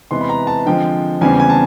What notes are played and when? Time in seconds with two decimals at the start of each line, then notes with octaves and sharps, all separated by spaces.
0.11 C3 E3 G#3 B3 C6
0.21 B5
0.29 A#5
0.47 A5
0.66 D3 F3 G#3 C4 G5
1.21 E2 C#3 E3 G3 C4 G#5
1.40 G#5
1.50 A5